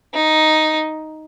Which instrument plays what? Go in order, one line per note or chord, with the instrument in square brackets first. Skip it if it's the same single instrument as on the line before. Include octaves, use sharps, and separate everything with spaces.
[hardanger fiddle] D#4